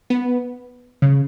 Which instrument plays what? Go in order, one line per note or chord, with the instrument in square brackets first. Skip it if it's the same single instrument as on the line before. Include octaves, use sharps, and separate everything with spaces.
[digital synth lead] B3
C#3